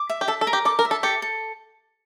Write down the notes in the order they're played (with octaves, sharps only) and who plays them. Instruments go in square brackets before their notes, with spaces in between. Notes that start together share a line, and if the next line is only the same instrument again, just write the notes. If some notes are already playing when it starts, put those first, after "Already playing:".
Already playing: [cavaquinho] D6
E5
[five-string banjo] G4
[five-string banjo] A4 [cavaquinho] E5
[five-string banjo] A4
[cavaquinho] A#4
[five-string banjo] G4
[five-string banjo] A4 [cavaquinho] D6
[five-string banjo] A#4
[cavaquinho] E5
[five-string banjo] A4
[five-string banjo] G4 [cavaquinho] A4
[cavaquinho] A4